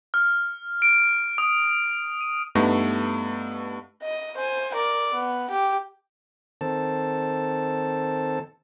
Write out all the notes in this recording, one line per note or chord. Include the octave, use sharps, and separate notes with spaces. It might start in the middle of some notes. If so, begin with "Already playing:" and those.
F6
D7
D#6
D#7
G2 A3 B3 D#4 A#6
D#5
C5 G#5
A#4 D5
B3
G4
D#3 C4 A4 A5